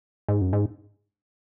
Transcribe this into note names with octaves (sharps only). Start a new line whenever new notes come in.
G#2
F#2
G#2